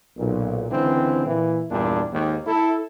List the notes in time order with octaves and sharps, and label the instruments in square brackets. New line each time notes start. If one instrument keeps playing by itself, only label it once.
[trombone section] B1 A#2
C#2 D3 E3 C4
A#2 E3
E2 G2 A#2 D4
D#2 G#2
E4 A4